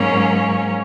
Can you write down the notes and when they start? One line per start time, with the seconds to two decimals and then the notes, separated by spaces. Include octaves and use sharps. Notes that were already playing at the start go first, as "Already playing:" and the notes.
Already playing: G#2 F#3 A#3 C#4 C#5